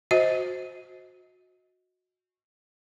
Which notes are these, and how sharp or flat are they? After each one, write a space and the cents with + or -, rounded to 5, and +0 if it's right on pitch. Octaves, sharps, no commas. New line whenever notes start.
F#4 -20 C5 +0 D#5 +25